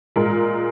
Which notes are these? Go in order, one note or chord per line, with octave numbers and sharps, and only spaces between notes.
A#2 G#3 A#4